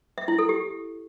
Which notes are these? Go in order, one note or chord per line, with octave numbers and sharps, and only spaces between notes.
E5
E4
A4
G4